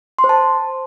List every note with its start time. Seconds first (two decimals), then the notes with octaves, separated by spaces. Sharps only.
0.19 C6
0.24 C5
0.29 A5